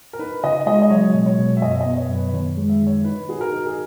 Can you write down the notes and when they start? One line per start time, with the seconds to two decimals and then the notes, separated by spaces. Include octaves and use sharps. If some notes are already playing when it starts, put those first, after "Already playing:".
0.13 A#4
0.19 D#4 B4
0.44 C#3 D#5
0.66 G#3 D#5
0.82 D#5
0.90 F#3 C#5
1.14 B2
1.26 C#5
1.39 B2
1.57 E5
1.62 F#2 D#5
1.81 D#5
1.86 B3
1.97 C#5
2.09 F#2
2.16 B4
2.33 D#3 C#5
2.57 G#3
2.69 E5
2.82 D#3 C#5
3.04 D#4 B4
3.29 F#4 G#4
3.41 A#4
3.52 D#4
3.66 G#4